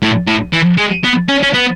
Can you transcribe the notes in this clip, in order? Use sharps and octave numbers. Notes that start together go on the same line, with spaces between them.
A2
A2
E3
G#3
B3
C#4
C#4
B3